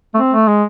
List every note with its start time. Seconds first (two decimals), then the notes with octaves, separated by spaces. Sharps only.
0.14 A3
0.17 C4
0.33 A3
0.48 G#3